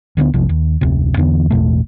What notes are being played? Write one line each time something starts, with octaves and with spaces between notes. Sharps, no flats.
D2 D3 G3 B3
F1 B1 C3 F3
D#2
F1 D2 C3
E2 D3 E3 B3
A1 E2 B2 A3